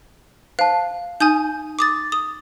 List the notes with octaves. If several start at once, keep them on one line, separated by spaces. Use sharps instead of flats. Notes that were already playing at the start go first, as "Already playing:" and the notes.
C5 F5 A5
D#4 G#5 D#6 G6
D6 D#6 A6
D#6